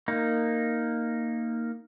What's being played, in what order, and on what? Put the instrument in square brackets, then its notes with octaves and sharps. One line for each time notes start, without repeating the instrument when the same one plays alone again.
[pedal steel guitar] A#3 D#4